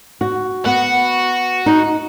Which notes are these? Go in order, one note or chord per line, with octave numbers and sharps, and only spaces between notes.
F#4
B3 F#4
D#4